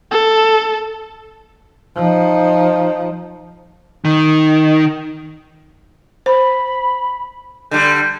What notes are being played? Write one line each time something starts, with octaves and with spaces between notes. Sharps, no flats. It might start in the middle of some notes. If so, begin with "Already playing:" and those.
A4
F3 D#4
D#3
C5 B5
D3 G3 G6